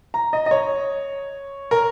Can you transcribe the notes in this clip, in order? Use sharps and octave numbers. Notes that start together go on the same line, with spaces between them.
A#5
D#5
D#5
C#5
A#4